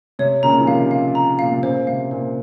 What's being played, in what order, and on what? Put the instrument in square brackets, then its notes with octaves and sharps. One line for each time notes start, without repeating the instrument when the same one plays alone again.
[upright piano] C3 [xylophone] C#5
[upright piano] A#2 C#3 [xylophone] A#5
[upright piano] F3
[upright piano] C3 D#3 [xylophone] F5
[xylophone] F5
A#5
[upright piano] A#2 [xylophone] F5
[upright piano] C3
[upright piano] A#2 C#3 [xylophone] C5
[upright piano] C3 [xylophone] F5
[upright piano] A#2 [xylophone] C5